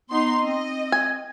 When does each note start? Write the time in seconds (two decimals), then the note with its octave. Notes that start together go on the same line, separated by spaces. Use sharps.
0.10 B3 D#4 C6
0.42 C4 D#5
0.92 G#5